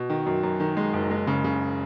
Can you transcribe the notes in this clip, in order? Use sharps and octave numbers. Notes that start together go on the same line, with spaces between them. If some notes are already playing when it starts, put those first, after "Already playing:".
Already playing: B2
D#3
F#2
F#2
D#3
G#3
F#1
G#3
C#3
C#3